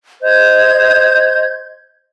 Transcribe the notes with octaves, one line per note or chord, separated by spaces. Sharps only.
C5 D#5 G6 G#6